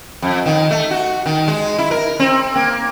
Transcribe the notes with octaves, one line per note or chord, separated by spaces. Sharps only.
F2
D#3
A3
F#4
D#3
G#3
E4
A#4
C4
A#3